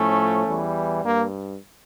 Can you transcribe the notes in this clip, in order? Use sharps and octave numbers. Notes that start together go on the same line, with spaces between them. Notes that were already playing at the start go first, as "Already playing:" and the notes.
Already playing: A2 F3 A3 C#4
E2 E3 G3
G2 A#3